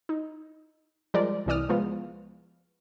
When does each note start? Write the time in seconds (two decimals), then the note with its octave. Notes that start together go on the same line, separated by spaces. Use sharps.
0.09 D#4
1.14 F3 G3 G#3 A#4 D5
1.46 C2 C3 E3 D5 D#6 F6
1.69 F3 G#3 B3 F4